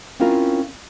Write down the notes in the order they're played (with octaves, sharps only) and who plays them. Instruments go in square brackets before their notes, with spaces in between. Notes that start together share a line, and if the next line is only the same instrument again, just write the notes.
[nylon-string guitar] C4 C#4 E4 F4 A#4